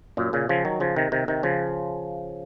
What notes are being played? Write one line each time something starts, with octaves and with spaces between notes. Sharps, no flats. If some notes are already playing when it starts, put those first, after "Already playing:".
F#2 A#2
A#2 C#3
C#3 F3
D#3 F#3
C#3 F3
C3 D#3
C3 D#3
C3 D#3
C#3 F3